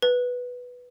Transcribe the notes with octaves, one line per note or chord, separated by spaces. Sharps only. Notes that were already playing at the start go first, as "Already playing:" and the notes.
B4